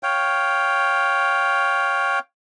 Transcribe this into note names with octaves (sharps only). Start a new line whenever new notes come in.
C#5 F5 G5